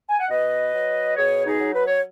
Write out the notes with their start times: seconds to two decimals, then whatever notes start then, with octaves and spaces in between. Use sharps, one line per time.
0.09 G#5
0.20 F#5
0.29 B2 B4 D#5
0.73 F#3
1.16 B2 G#4 C#5
1.45 D#4 G#4
1.60 F#3
1.74 B4
1.87 C#5